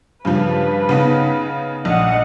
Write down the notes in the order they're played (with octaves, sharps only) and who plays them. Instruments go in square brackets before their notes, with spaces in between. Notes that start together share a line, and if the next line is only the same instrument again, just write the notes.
[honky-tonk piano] G2 C#3 F3 [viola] B4
[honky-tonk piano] C#3 B3 D#4
[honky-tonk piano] A#1 [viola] D#5 F#5